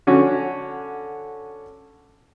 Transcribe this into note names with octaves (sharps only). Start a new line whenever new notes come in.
D3 C#4 F#4